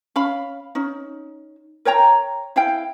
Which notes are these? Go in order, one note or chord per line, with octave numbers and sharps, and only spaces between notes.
C#4 F5 B5
C#4 D#4
A#4 C#5 G5 A#5
E4 F5 G5